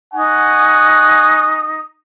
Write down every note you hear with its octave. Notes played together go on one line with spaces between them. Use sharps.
D#4 F#5 G#5 C#6